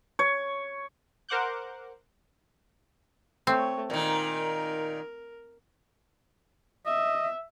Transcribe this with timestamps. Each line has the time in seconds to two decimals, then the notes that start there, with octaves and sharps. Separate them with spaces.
0.19 C#5
1.29 A#4 C5 F#5 D6 F#6 G6
3.47 A3 C4 C#5
3.90 A#2 D#3 A#4
6.86 D#5 E5